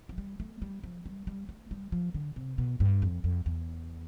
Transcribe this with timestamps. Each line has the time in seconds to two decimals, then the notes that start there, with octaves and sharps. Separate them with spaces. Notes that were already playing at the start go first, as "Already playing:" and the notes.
0.09 F3
0.18 G3
0.40 A3
0.62 G3
0.83 F3
1.06 G3
1.27 G3
1.49 A3
1.71 G3
1.92 F3
2.14 D3
2.36 C3
2.58 B2
2.80 G2
3.02 F2
3.24 F2
3.46 E2